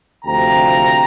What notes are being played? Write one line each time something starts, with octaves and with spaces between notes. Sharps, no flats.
D2 C3 F3 G5 A#5